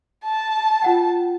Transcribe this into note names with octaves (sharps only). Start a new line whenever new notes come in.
A5
F4 F#5 G5